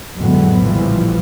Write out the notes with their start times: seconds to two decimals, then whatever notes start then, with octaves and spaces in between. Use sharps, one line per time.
0.18 F2 A2 D3 F#3 G#3 B3
0.59 A#1 E3 F3 G3